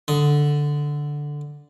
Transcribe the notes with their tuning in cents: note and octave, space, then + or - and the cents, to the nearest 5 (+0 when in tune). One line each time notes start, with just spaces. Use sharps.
D3 +0 D#6 +15